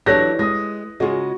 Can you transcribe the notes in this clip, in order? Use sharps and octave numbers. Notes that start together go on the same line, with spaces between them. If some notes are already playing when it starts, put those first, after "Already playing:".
E3 F#3 D4 G4 A4 C#5 F#6 A#6
G#3 D#6 A#6
C#3 G#3 F4 F#4 G#4 D#5